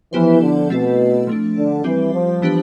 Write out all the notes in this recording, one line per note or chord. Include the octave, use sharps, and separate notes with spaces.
E3 F3 B3 E4 G4 C5
D3
B2 A3 C4 E4 A4
F3 A3 D4
D3
E3 G3 C4 G4
F3
E3 B3 D4 G4 B4